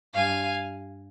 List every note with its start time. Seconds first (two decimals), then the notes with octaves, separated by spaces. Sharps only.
0.15 G2 G3 F5 G#5